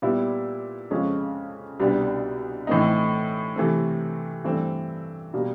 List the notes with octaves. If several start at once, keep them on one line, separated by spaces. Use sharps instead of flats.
A#2 G3 B3 E4
F2 C#3 F3 G#3 C#4
C2 B2 G3 B3 D4
A2 E3 A3 C4 D#4
C3 E3 A3 C4
G2 E3 A3 C4
B2 G3 A#3